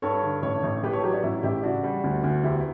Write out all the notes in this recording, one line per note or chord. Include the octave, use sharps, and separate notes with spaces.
G2 A4 C#5
D3
A1 A4 C#5
A1
A2 G4 B4
A4 C#5
F#3 G4 B4
D4
A1 E4
A1 E4 G4
C#3 D4 F#4
G3
D2
D2
E2 E4 G4